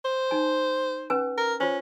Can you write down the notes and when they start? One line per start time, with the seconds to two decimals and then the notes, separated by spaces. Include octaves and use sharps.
0.05 C5
0.31 D#4 G#5
1.10 C#4 B4 G#5
1.38 A#4
1.60 C#4 F4 C5